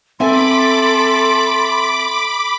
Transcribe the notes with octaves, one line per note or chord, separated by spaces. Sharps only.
C4 A4 E5 G#5 B5 C6 D6